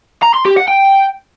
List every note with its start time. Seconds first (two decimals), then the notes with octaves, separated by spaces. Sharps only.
0.23 A#5
0.34 C6
0.45 G4
0.57 F#5
0.68 G5